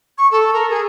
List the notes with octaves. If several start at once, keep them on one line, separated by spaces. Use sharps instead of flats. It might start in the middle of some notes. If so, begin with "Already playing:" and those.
C#6
A4
A#4
G#4